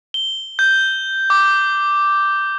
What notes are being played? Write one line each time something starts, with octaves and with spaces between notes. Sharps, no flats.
G7
G6
D6